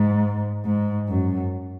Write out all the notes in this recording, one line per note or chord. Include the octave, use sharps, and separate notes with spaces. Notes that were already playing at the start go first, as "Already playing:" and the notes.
Already playing: G#2
G#2
F#2